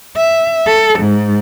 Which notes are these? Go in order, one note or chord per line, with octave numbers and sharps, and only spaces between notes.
E5
A4
G#2